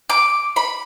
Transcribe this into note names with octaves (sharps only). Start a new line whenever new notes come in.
D6
B5